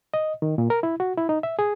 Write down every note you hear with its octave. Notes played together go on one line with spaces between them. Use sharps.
D#5
D#3
A#2
A#4
E4
F#4
E4
D#4
E5
G#4